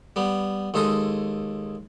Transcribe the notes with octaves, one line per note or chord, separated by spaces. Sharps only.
G3 B3
D#2 G#3 G#4 A4 C6 D#6